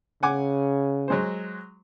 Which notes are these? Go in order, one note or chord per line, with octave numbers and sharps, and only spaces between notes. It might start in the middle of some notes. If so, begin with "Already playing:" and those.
C#3 F#5 G#5 D6
F#3 G#3 C5